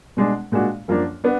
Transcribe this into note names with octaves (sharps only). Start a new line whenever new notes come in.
B2 G#3 D4
A#2 G#3 D4 F#4
F#2 F3 A#3 D4
B3 D4